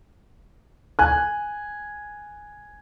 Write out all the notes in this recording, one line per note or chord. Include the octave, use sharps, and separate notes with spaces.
G#5 F#6